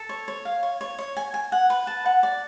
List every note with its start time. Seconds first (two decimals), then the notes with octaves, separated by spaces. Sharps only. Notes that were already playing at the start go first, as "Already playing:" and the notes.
Already playing: A4
0.09 C#5
0.28 C#5
0.45 F5
0.63 C#5
0.81 C#5
0.99 C#5
1.17 G#5
1.34 G#5
1.52 F#5
1.70 B4
1.87 A5
2.06 F#5
2.23 D5